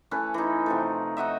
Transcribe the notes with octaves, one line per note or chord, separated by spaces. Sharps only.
E3 A3 C#4 B4
E3 D#4
C3 F3 A3
D#4 F#4 D#5 E5